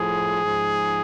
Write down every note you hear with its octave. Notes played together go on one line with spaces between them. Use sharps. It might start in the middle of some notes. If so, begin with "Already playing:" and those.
Already playing: A2 F3 G#4
G#2 F3